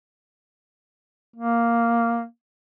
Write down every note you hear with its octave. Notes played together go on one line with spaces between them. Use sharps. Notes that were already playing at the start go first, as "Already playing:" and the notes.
A#3